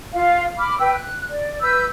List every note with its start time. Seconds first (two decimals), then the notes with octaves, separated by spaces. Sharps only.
0.13 F4 F5
0.57 B5 D6 F6
0.78 B4 G5 E6
0.94 F#6
1.29 D5
1.61 B4 E6 G6